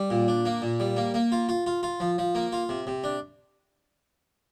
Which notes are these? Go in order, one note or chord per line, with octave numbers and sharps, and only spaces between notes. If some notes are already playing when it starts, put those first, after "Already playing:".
Already playing: G3
A#2
D4
A#3
A#2
G3
A#3
A#3
F4
F4
F4
F4
F3
F3
A#3
F4
C3
C3
D4